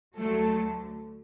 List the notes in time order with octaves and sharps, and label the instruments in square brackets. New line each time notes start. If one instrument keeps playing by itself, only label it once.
[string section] D2 D3 F#3 A3 A4